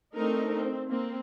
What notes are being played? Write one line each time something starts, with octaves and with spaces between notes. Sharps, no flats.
A3 C4 D4 D#4 A#4
C4
A#3 C4